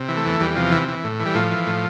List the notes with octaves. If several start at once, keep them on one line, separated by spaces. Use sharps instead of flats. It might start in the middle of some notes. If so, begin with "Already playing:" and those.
Already playing: C3
E3
A3
E2
E2 G3
C3 F3
E3
E3
A2
E3
G3
A2 F3
E3
A2